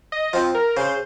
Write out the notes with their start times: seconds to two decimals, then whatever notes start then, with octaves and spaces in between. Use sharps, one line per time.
0.12 D#5
0.33 F3 C4
0.55 A#4
0.77 C#3 C5